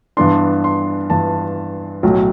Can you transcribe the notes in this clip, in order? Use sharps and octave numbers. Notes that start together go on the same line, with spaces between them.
G2 E3 B3 D4 C6
C6
G2 E3 B3 D4 A5
B1 A2 F#3